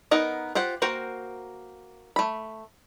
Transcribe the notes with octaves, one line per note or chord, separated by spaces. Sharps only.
B3 D#4 A#4 D#5 F#5
F4 G4 C5 F#5
A#3 F#4 A#4 C5 G5
A3 B5